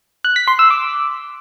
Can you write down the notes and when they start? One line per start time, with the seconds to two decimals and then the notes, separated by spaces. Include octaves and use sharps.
0.25 F#6
0.36 B6
0.48 C6
0.59 E6
0.71 D6